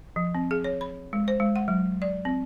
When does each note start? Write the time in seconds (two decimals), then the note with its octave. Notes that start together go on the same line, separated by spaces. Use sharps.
0.16 F3
0.35 C4
0.51 G#4
0.64 C#5
0.81 B5
1.13 G#3
1.28 C5
1.40 G#3
1.56 F#5
1.68 F#3
2.02 D5
2.25 C4